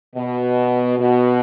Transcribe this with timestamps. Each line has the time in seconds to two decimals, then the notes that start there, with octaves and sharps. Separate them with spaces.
0.16 B2
0.98 B2